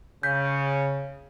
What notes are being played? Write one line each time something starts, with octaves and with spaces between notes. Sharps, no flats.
C#3 G6 B6